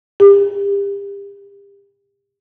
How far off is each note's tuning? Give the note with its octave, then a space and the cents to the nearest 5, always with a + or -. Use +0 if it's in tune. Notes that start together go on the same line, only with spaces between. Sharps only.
G4 +35